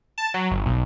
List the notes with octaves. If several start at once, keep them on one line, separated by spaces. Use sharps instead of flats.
A5
F#3
G1
B1